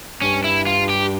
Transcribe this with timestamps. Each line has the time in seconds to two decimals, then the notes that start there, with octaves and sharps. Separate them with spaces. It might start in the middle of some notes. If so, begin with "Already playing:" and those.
0.22 G2 C#4
0.44 E4
0.67 F4
0.90 G4